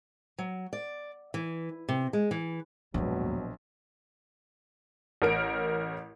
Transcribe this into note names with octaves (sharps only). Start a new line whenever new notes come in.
F#3
D5
E3
C3
G#3
E3
A#1 D#2 G#2 B2 F#3
A1 A#4 D7